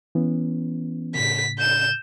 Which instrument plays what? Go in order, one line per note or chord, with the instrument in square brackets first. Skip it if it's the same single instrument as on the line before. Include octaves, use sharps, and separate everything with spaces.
[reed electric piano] E3 B3 C#4
[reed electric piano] A2 C#3 [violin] B6
[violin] G6 E7